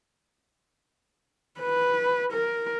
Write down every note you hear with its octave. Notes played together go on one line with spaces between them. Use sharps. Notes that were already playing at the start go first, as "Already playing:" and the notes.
B4
A#4